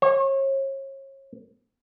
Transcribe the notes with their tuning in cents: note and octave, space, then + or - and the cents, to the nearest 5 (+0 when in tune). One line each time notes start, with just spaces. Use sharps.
C#5 -35